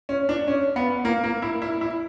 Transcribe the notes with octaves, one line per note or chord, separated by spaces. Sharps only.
C#4
D4
C#4
B3
A#3
A#3
E4
E4
E4